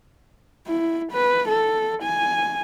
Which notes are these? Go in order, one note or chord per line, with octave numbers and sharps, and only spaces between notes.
E4
B4
A4
G#5